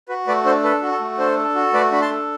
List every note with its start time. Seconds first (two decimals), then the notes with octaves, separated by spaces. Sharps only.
0.09 F#4 B4
0.27 A3 B4 D5
0.45 D4 A4 C5
0.63 A4 B4
0.82 F#4
0.91 A4
1.00 A3
1.18 D4 A4 C5
1.37 A4
1.55 F#4
1.73 A3 B4 D5
1.91 D4 B5
2.02 A5 C6
2.10 A4